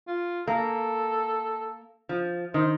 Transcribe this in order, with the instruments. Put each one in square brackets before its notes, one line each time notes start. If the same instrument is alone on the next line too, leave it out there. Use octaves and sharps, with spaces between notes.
[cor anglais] F4
[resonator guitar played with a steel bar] A#3 [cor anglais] A4
[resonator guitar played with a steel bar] F3
[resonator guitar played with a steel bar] D#3 [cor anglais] C5